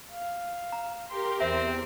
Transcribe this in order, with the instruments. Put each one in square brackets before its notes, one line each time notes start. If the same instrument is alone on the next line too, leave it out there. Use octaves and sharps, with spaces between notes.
[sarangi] F5
[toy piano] A#5
[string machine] G4 A#4 [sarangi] C6
[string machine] E2 [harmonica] C4 [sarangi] C5 [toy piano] E5